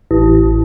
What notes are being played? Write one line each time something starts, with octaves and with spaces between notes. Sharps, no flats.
A1